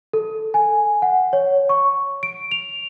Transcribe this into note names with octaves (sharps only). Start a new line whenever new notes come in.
A4
G#5
F#5
C#5
C#6
D7
F7